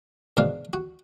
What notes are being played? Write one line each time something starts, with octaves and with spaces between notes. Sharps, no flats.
G#2 B2 D#3 D4 F5
F#4